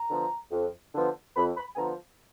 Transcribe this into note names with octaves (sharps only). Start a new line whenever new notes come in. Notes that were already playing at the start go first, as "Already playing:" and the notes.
Already playing: A#5
D3 F3 B3
F2
D3 F3 B3
F2 B5
B5
G#5
D3 F3 B3 A#5